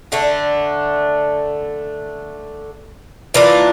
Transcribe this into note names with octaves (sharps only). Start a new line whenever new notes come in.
D3 A3 D4
E3 A#3 D4 F4